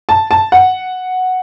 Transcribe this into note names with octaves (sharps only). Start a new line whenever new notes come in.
A5
A5
F#5